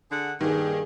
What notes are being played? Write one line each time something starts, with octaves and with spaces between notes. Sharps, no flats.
D3 G#4 F#5
G2 D#3 A#3 G#4